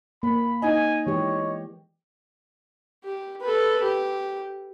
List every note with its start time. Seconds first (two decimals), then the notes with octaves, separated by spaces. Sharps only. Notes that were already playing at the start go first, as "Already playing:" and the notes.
0.23 A#3 B5
0.62 D#4 G#5
1.07 E3 G#3 G4 C#5
3.04 G4
3.42 A4 B4
3.82 G4